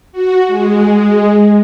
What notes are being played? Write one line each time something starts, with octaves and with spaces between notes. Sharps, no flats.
F#4
G#3